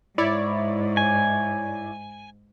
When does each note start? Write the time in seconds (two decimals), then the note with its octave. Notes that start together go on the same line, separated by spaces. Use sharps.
0.18 G#2 E4 C#5 D5
0.97 G#5